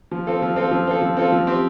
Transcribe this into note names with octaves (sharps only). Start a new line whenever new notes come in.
F3
C4 F4 A4
F3
C4 F4 A4
F3
C4 F4 A4
F3
C4 F4 A4
F3
C4 G4 C5